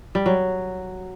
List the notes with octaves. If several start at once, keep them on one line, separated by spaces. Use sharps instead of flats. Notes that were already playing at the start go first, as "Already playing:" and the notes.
G3
F#3